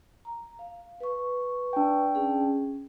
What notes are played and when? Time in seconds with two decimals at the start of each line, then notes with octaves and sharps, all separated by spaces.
0.25 A#5
0.59 F5
1.00 B4 C#6
1.73 D4 G5
2.15 C#4 G#4